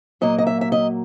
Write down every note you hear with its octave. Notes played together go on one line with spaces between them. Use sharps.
A#2 F#3 A#3 D#5
D#5
E5
E5
D#5